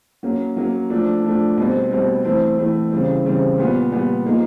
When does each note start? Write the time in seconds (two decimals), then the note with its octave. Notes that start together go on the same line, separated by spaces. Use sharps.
0.23 F#3 A#3 C#4
0.57 F#3 A#3 C#4
0.90 F3 A3 D4
1.24 F3 A3 D4
1.57 B2 G3 C4
1.91 B2 G3 C4
2.24 E3 A3 C4 E4
2.58 E3 A3 C4 E4
2.92 C#3 E3 G3 C4
3.25 C#3 E3 G3 C4
3.58 A#2 G3 B3
3.92 A#2 G3 B3
4.26 F3 A#3 D#4